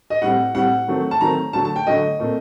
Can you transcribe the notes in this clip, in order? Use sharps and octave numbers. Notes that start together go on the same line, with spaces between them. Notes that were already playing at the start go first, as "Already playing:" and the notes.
D#5
A2 G3 C4 F#5
A2 G3 C4 F#5
D#3 F#3 A3 C4
A5
D#3 F#3 A3 C4 A#5
D3 F#3 A3 A5
A5
G5
D3 F#3 A3 D#5
A#2 A3 C4